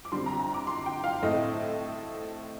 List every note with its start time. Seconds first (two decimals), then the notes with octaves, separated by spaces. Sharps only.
0.05 D6
0.12 D3 G3 C4 C6
0.26 A#5
0.39 A#5
0.54 D6
0.67 C6
0.86 G5
1.04 F5
1.23 A2 A3 C4 D#5